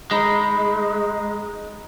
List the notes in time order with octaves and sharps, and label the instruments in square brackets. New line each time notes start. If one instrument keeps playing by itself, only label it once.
[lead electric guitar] G#3 [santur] D#4 B5